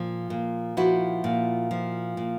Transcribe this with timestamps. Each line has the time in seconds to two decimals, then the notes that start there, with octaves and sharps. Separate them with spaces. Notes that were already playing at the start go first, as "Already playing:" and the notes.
Already playing: A#2 F3
0.30 A#2
0.77 F3 E4 F#4
1.24 A#2
1.71 F3
2.17 A#2